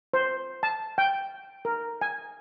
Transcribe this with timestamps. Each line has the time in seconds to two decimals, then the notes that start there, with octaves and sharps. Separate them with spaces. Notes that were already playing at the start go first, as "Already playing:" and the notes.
0.13 C5
0.63 A5
0.98 G5
1.65 A#4
2.01 G#5